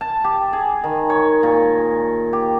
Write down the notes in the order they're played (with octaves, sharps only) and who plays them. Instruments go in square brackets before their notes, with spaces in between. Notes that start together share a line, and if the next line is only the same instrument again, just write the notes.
[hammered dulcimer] A5
G4
G#4
D#3
C#5
A#2
G4